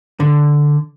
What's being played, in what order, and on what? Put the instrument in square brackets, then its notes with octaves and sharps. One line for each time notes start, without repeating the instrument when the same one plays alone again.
[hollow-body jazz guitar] D3